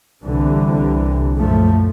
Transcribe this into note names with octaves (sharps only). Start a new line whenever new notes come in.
C2 D3 E3
F#2 A#2 F3 A3